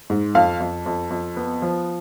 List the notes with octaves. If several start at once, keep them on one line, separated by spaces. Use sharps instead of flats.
G#2
F2 F5
F2
F2
F2
B3
F3